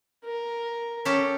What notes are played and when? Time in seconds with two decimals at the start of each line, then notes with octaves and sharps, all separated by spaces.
0.25 A#4
1.05 C#4 G4 A4